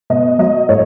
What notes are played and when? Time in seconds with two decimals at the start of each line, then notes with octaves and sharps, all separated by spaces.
0.10 B2 D#5
0.39 F#3 D#5
0.69 A2 C#5